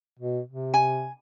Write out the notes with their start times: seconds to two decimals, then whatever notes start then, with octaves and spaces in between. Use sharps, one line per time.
0.19 B2
0.48 C3
0.74 G#5